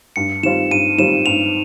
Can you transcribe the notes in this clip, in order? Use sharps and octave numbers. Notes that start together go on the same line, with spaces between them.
G2 C#7
D#3 G3 C4 F4 E7
G2 D#7
D#3 G3 C4 F4 E7
G2 F7